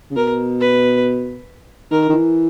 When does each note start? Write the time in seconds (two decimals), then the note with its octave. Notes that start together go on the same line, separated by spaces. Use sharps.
0.11 C#3
0.16 B2 A#4
0.61 B4
1.91 D#3 A#4
2.10 D#3
2.13 E3